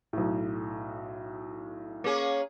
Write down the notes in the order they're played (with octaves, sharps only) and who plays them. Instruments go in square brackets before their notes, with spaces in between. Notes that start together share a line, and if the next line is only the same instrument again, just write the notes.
[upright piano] B1 A2
[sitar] A#3 C#4 G#4